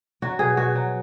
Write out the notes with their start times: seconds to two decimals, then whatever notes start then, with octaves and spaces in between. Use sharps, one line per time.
0.22 F#3 F#4
0.39 B2 G#4
0.57 B2 F#4
0.75 F#3